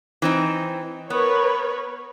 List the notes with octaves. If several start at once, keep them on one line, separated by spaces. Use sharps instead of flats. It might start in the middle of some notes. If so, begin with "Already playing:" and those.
E3 C4 D#4
B3 A#4 B4 C#5